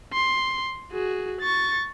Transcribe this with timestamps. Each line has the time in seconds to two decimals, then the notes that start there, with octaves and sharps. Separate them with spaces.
0.13 C6
0.92 F#4 G#4
1.41 C#6 A6